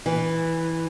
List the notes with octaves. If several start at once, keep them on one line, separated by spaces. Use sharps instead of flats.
E3